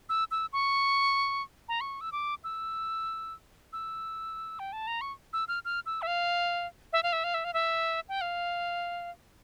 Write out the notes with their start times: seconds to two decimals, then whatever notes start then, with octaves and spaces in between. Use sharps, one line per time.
0.09 E6
0.31 E6
0.53 C#6
1.69 A#5
1.81 C#6
2.01 E6
2.12 D6
2.44 E6
3.73 E6
4.59 G5
4.73 A5
4.87 A#5
5.01 C#6
5.33 E6
5.48 F6
5.65 F6
5.86 E6
6.02 E5
6.07 F5
6.93 E5
7.03 F5
7.13 E5
7.24 F5
7.34 E5
7.44 F5
7.54 E5
8.09 G5
8.21 F5